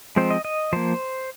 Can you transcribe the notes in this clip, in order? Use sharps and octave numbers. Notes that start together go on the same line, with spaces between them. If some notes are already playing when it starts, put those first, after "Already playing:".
F3 G#3 C4 C5
D#5
D#5
F3 A#3 C5